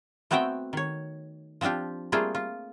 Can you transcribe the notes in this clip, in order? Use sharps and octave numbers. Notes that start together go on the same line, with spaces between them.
A3 B3 C4 F#4 E5 G5
D#3 C#5
F3 C4 D4 F4 G4
G3 A3 A#3 C4 F4 G#4
F4